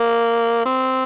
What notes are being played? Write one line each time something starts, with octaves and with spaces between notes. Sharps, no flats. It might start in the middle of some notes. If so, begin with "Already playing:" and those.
Already playing: A#3
C4